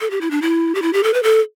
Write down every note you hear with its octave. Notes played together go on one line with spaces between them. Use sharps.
A4
G4
E4
D4
E4
G4
E4
G4
A4
B4
A4